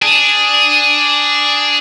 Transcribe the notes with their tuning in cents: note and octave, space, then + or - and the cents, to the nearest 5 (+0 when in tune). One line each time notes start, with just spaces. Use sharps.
D4 +0 G#4 +0